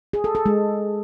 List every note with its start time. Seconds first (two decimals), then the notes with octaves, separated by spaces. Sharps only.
0.13 G#4
0.24 A4
0.35 A4
0.46 G#3